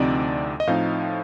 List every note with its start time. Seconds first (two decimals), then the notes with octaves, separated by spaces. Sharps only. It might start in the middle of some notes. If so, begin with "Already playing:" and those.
Already playing: D2 C3 F3 C4 D#4 D5
0.60 D#5
0.67 A2 F3 C4 D#4 F5